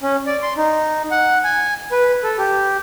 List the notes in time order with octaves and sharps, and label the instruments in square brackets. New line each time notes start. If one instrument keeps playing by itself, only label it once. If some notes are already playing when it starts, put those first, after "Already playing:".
[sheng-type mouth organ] C#4
D5
C6
D#4
F#5
G#5
B4
A4
G4